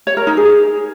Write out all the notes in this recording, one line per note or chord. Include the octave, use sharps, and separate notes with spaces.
C#5
A#4
D#4
G#4